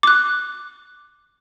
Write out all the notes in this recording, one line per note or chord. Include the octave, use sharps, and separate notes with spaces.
D6 F#6